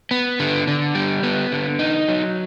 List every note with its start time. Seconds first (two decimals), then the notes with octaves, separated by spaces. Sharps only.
0.11 B3
0.39 D3
0.67 D3
0.95 G3
1.23 B3
1.52 D3
1.79 D#4
2.08 F#3